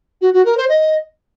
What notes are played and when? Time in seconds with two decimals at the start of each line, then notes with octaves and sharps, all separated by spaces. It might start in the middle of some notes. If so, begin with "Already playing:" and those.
0.21 F#4
0.33 F#4
0.45 A#4
0.57 C5
0.69 D#5